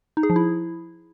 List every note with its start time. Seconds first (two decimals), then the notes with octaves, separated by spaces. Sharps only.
0.17 D#4
0.23 G#4
0.30 F3
0.36 E4